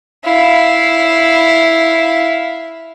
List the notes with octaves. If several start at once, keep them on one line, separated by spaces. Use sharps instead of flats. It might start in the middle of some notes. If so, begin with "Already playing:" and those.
E4 F5